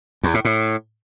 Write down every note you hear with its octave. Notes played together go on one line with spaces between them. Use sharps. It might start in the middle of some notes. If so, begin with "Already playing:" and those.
E2
A2
A2